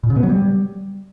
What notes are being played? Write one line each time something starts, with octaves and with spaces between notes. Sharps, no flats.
A#2
C#3
B3
F#3
G3